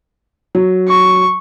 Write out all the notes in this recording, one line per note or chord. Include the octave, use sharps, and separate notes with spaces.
F#3
C#6